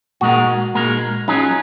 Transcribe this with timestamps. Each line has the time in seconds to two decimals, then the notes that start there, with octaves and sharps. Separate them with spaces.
0.21 A#2 G#3 D#4 F#4 A#4
0.74 A#2 G#3 D#4 A#4
1.28 F#3 C#4 D#4 F4 G#4